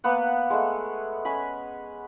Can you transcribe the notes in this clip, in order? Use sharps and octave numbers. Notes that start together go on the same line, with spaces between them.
A#3 B3 B4 F#5
G#3 A3
C#4 G#5 B5